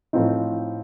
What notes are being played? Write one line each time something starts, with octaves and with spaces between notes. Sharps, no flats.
A2 F3 C4 D#4